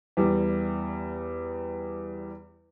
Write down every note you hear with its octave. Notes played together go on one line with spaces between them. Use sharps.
E2 G3